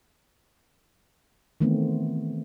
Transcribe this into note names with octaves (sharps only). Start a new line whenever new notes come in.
D#3 E3 A3 B3 C4